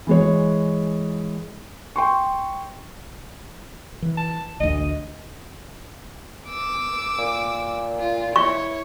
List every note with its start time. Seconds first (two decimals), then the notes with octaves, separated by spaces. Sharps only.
0.07 E3 G#3 C#5
1.96 G5 C6 C#6
4.02 E3
4.17 A5
4.60 A1 D2 D#5
6.49 D6 E6
7.18 A#2
7.99 F4
8.36 E4 C#5 C#6